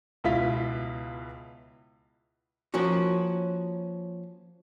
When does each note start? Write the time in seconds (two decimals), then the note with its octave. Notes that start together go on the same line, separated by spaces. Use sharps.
0.24 C#2 B2 E4 F4 B6
2.74 F3 A#3 C#4 F#4